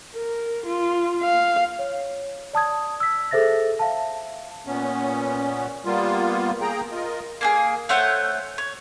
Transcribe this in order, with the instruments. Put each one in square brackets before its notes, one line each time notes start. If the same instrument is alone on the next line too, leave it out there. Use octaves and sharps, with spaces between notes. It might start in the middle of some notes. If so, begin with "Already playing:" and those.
[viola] A#4
F4
F5
[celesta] C#5
D5 A5 D#6 G#6
E6 B6
G#4 A4 C5 E5 A6 A#6
E5 F5 A5
[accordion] A#2 B3 C#4
G3 A#3 B3 F4
A#3 G#4 G5 A#5
F4 A#4 D#5
[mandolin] A#3 D4 G#4
A3 C5 C#5 F#5
C#5